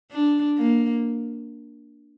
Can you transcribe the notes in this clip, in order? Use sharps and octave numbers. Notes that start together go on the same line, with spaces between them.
D4
A#3